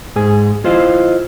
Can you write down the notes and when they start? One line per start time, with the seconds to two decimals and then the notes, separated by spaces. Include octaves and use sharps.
0.16 G#2 G#4 G#5
0.64 E4 F4 C5 D#5 F5